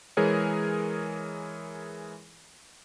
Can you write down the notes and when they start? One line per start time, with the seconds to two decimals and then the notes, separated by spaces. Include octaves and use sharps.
0.17 E3 G#3 G#4 A#4 C#5